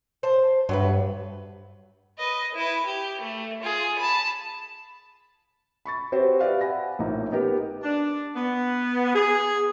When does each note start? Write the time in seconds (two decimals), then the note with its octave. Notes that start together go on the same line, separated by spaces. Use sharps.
0.23 C5 A5
0.69 G2 F#3 A3 B4
2.18 B4 D#5
2.54 E4 B4
2.86 G4
3.21 A3
3.62 F4 G#4
3.98 A5 B5
5.85 B5 C#6 A6
6.12 C4 F#4 G4 B4 C5
6.41 F#4 G4 B4 D5 E5 F5
6.61 E5 F#5 G#5 B5 A#6
6.99 A#1 A2 A#3 D#4
7.32 B3 D#4 G4 A#4 B4
7.83 D4
8.35 B3
9.15 G#4